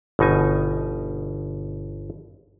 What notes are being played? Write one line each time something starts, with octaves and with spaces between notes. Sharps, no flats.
G1 B2 D#4 G#5